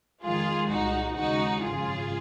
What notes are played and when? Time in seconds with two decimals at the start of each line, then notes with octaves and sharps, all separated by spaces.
0.23 F2 D#3 G#3 F4 G#4
0.70 C2 A#2 G#3 D#4 F#4
1.16 D#2 C#3 G#3 D#4 F#4
1.63 G#1 F#2 C#3 F3 F4 G#4